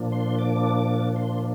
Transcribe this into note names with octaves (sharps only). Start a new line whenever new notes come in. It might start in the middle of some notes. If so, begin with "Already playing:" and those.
Already playing: A#2 F3 A#3 D4
C6
D6
C6